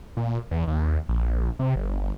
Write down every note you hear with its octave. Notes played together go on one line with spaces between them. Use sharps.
A#2
E2
D#2
A#1
C3
G1
G1